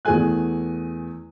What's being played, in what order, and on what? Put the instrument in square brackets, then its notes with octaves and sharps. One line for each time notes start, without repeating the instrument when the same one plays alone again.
[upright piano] E2 E3 A3 G#4 G#5 F#6